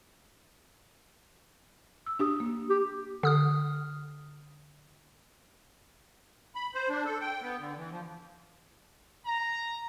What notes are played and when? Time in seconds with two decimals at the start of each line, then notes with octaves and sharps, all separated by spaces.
2.06 E6
2.19 D4 G4 D#6
2.40 A#3
2.70 G4
3.23 D3 D#6 F6
6.55 B5
6.74 C5
6.89 D4
7.05 A4
7.21 G5
7.42 B3
7.59 D3
7.77 E3
7.91 F3
9.25 A#5